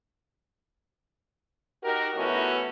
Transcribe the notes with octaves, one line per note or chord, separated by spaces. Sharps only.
D#4 F#4 G4 A#4
E3 A3 B3 C#4 F#4